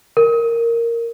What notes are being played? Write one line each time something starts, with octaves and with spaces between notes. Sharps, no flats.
A#4